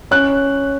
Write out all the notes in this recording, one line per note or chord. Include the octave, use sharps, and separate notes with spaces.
C#4 F#6